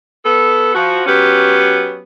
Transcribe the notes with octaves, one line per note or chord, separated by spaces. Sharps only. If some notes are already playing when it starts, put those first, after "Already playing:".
B3 A4
F3 F#4
F#3 B3 C#4 G4